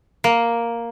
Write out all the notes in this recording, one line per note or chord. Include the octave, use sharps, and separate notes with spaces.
A#3